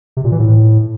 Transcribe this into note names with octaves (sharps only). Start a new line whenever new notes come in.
C3
A#2
E3
A2